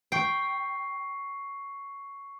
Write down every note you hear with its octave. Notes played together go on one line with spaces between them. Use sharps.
G5 C#6 C7